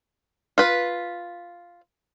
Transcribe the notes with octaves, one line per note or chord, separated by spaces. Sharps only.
F4 B4